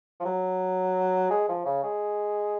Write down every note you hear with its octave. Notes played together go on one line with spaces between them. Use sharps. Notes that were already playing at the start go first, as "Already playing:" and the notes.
F3
F#3
G#3
F3
C#3
G#3